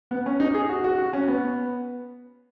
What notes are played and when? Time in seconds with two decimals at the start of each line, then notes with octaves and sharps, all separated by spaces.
0.11 B3
0.26 C#4
0.40 D#4
0.54 G#4
0.69 F#4
0.84 F#4
0.98 F#4
1.13 C#4
1.28 B3